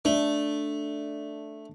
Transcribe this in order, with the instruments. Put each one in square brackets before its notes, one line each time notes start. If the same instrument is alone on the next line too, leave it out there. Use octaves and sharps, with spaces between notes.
[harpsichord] A3 [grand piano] D4